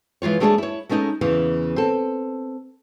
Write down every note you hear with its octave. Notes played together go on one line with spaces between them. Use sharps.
E3 G#3 F4 C#5
G#3 A3 D4 G#4 C#5 D5
E4 C#5
G#3 A3 C#4 D#4 D#5
E2 C#3 E3
C4 A4